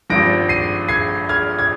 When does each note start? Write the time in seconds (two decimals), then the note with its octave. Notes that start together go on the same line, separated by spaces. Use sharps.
0.10 G#1 G2 F3 A#6 D7
0.49 C7 D#7
0.89 G#6 C7
1.29 F6 G#6
1.59 G#6